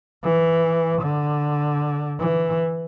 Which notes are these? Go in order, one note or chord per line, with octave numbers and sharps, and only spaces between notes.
E3
D3
E3